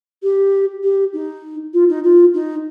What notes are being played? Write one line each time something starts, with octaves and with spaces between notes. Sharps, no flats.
G4
G4
D#4
F4
D#4
F4
D#4